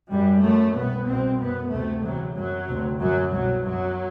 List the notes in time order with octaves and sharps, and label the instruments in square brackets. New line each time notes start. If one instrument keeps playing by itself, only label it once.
[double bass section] F#2 G3
F#2 A3
C2 B2 B3
C2 B2 C4
F#2 B3
D2 C3 A3
E2 C3 F#3
F#2 F#3
D2 C3
F#2 F#3
C2 B2 F#3
F#2 F#3